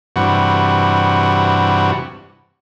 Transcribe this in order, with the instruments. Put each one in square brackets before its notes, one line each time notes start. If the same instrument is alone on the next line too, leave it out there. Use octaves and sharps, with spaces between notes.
[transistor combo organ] G2 C3 E3 F#4